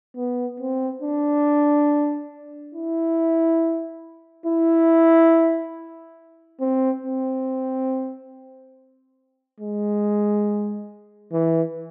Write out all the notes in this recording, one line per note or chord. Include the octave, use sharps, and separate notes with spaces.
B3
C4
D4
E4
E4
C4
C4
G#3
E3